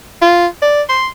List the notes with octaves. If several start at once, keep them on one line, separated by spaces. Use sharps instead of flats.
F4
D5
C6